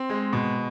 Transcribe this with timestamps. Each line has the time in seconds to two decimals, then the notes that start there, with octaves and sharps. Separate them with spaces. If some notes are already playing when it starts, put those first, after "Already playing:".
Already playing: C4
0.10 G#3
0.33 B2